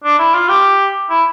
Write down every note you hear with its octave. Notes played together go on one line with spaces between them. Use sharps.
D4
E4
F4
G4
E4